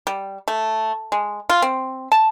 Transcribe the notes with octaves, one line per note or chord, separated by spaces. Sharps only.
G3
A3
G#3
F4
C4
A5